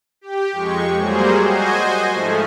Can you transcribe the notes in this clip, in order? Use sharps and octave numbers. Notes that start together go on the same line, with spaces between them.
G4
F2 G#3 C#6
F#3 G3 A#3 G#4 C5
F#4 C5 D#5 G#5
G#2 F3 A3